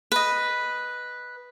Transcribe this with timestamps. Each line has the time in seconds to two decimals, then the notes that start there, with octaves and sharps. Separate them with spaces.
0.12 B4 D#5